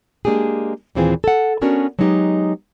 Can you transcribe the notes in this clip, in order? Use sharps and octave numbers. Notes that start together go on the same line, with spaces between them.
G#3 A#3 D4 G4 G#4
D#2 A#2 E3 C4 F4 G#4
A4 F#5
B3 C#4 D4 F#4 A#4
F#3 G#3 B3 D#4 F4 G4